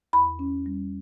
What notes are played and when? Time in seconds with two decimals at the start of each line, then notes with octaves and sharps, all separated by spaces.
0.13 E2 B5
0.39 C#4
0.66 G3